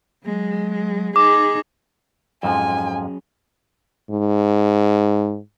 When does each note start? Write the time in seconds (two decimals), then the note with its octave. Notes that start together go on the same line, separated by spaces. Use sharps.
0.24 F#3 G#3
1.16 D#4 G#4 D6
2.43 F2 G#2 F3 F#3 C#4 G#4 G#5
4.11 G#2